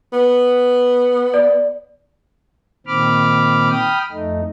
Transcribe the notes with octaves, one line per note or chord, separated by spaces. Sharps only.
B3
D5
A#2 D#3 C4 B5 D6 F6
G5 B5 D#6 F6
F2 A3 D#4